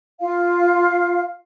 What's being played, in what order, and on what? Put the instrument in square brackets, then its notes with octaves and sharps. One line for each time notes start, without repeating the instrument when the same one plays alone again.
[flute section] F4 F5